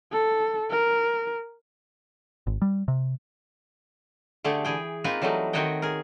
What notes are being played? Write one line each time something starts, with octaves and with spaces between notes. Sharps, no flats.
A4
A#4
G#1
G3
C3
D3 A3 G4 G#4
E3 G#4 G5
A#3 C4 D#4 F4 A#4 B4
E3 F#3 G3 A3 D#4
D#3 C4 F#4 C#5 D#5 G5
G#4 A#4